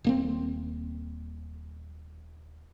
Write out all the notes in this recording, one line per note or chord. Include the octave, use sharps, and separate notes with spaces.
D#1 A#3 C4